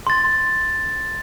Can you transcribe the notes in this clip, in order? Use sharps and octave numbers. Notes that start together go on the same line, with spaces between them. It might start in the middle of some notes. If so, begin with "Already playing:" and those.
C6 A6